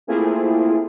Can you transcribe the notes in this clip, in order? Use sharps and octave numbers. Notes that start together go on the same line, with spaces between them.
A3 A#3 C4 E4 F4 G#4